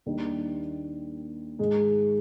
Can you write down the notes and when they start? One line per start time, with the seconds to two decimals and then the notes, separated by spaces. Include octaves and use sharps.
0.06 D#2 D#3 G3 D4
1.59 G#2 D#3 G#3